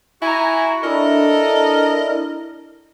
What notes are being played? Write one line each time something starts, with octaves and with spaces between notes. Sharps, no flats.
E4 F#4 G#5 A#5
D4 E4 A4 A#4 D#5